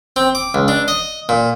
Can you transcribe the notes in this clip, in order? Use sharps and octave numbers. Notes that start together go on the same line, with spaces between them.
C4
D6
C#2
D4
D#5
A#2